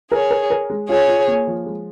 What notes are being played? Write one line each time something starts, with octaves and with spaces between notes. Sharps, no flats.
G#4 A#4 C#5
A#4
A#4
G#3
F4 G#4 C#5
F4
A#3
F3
G#3